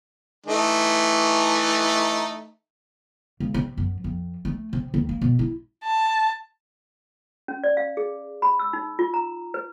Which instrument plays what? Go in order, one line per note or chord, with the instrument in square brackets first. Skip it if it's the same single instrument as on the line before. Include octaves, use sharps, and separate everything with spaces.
[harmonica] E3 A3 D#4
[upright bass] C#2
C3
F#2
F2
A3
C3
D#2
A#3
B2
E4
[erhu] A5
[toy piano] C#4
D5
F5
G#4
B5
E6
D#4
F4
A#5
B4